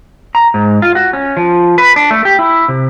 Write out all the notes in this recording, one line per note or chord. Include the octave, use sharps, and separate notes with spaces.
A#5
G#2
F4
F#4
C#4
F3
B4
D4
A3
G4
E4
C3